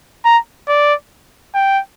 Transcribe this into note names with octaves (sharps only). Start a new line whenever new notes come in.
A#5
D5
G5